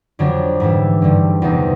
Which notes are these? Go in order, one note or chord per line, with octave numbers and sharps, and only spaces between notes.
F2 D3 F#3 D4
G#2 E3 G3 E4
G2 D3 G3
E2 C3 F3 D#4